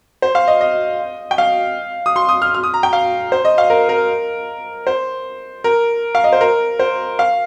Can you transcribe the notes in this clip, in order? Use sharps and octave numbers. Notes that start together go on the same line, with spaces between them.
C5
F5
D#5
D#5
G5
F5
D#6
C6
D#6
F6
F6
D#6
A#5
G5
F5
C5
D#5
F5
A#4
A#4
C5
A#4
F5
D#5
C5
A#4
C5
F5